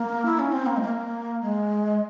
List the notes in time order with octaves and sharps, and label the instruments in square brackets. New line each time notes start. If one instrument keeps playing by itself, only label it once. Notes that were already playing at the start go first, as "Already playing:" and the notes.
Already playing: [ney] A#3
E4
C#4
C4
A#3
G#3
A#3
G#3